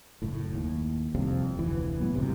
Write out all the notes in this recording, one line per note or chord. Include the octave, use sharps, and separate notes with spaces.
F#1 A2
D#2
C2 F2 C3
F1 D2 E3
A2 F#3 B3
G1 C#2 C3